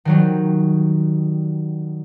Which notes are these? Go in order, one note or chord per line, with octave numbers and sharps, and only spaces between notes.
D#3 F#3 G3